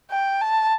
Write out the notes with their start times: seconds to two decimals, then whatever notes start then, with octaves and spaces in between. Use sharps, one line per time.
0.11 G5
0.41 A5